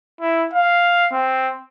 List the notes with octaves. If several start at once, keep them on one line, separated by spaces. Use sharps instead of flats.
E4
F5
C4